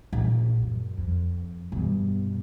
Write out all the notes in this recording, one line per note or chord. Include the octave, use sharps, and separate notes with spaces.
A#1
F#2
F2
G2 B2